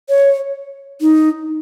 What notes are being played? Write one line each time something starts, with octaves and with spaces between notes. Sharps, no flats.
C#5
D#4